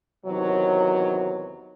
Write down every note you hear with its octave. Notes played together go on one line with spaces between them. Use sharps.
E2 C3 D#3 F#3